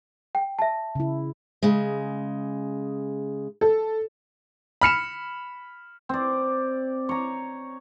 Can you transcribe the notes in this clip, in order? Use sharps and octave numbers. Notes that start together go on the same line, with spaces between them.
G5
E5 A5
C#3 E4
C#3 G#3
A4
B5 F6 C#7 E7
C4 D5
C#5 A#5